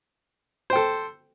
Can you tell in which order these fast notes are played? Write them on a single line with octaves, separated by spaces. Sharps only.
C5 G5 A4